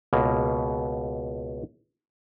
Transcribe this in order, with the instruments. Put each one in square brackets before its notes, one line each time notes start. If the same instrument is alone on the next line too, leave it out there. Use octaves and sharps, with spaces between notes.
[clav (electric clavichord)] C#2 B2 A#3